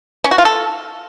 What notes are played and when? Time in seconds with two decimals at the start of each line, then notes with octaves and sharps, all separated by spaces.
0.24 C#4
0.31 F#4
0.38 F4
0.45 A4